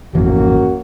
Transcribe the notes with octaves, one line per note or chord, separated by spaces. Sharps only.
G#1 F2 E3 A#3 C#4 F#4